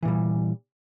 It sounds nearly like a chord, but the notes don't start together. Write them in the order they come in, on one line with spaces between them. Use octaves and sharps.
E3 A#2 G3